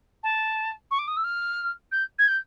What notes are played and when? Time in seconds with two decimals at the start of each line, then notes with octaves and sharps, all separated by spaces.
0.23 A5
0.91 C#6
0.99 D6
1.07 D#6
1.17 E6
1.24 F6
1.92 G6
2.19 G#6
2.28 G6